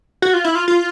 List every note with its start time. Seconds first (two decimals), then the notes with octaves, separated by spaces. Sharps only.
0.22 F#4
0.34 F4
0.44 E4
0.55 F4
0.68 F4